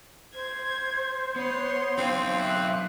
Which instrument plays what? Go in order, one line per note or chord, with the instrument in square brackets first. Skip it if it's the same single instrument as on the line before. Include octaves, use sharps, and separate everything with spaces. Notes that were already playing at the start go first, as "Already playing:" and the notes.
[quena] C5 [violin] G#6
[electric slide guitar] B3 [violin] C#5 C6
[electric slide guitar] F#3 D#4 F5 [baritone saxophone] C4
[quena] E5 [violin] F#6